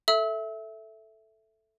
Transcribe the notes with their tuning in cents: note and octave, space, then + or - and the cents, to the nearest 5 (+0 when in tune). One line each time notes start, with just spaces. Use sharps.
A4 +0 E5 +0 E6 -35